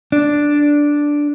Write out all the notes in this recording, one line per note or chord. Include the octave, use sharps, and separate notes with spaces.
D4